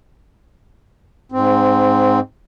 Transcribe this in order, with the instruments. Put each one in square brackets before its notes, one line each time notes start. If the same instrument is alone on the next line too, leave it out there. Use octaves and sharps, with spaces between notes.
[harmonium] G#2 C4